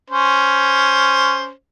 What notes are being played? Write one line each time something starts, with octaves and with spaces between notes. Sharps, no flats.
C#4 C5